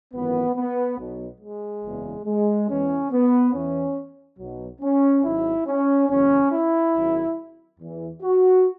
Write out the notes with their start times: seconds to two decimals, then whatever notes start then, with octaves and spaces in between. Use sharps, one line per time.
0.14 G#1 F#2 E3 B3
0.56 B3
0.98 B1 B2 F#3
1.41 G#3
1.83 F#1 E2 C#3 E3
2.26 G#3
2.69 E2 C#3 E3 C#4
3.11 B3
3.53 E2 E3 C#4
4.39 B1 B2 F#3
4.81 C#4
5.24 G#1 G#2 F#3 E4
5.67 C#4
6.09 F#1 E2 C#3 F#3 C#4
6.52 E4
6.93 G#1 F#2 F#3
7.79 E2 E3
8.22 F#4